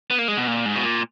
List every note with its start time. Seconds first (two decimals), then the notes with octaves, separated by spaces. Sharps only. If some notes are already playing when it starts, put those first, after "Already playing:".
0.11 B3
0.19 A#3
0.28 G#3
0.37 B2
0.47 A#2
0.65 G#2
0.76 B2
0.84 A#2